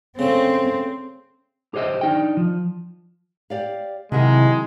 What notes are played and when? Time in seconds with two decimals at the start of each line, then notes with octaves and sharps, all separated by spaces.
0.19 C#3 A3 C4
1.74 G4 G#4 C5 D#5 E5
2.01 D4 D#4 G5
2.37 F3
3.50 G4 D5 F5
4.12 C3 D#3 F#3 G#3 E4